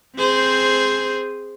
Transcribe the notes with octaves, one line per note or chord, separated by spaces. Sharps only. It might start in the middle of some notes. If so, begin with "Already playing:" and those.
C4 G#4 C5